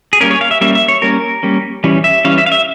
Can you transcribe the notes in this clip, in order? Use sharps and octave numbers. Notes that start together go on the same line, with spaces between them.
G#4
G3 A#3 C#4 A#4
C#5
F5
E5
G3 A#3 C#4 E5
E5
C#5
G3 A#3 C#4 A#4
G3 A#3 C#4
E3 G3 C#4
E5
E3 G3 C#4 F5
E5
F5
E5